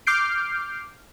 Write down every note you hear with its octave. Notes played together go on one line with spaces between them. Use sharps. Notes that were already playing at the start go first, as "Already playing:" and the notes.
D6 F6 G6 C7 D7